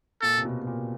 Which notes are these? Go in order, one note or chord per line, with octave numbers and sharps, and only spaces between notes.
A#2 A4
C3
B2
B2
A#2